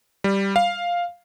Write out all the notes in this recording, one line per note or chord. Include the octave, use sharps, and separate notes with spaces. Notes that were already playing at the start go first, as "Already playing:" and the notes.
G3
F5